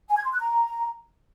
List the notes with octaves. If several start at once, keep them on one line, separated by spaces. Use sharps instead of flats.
G#5
G#6
C6
F#6
A#5